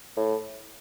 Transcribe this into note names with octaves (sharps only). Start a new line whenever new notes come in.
A2